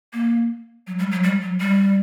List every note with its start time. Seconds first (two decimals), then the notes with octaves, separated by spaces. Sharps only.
0.13 A#3
0.87 F#3
0.99 G3
1.11 F#3
1.24 G3
1.42 F#3
1.60 G3